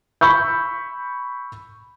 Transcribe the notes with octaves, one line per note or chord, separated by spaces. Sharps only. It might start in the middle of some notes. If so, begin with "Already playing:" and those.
B5 C#6 E6 G6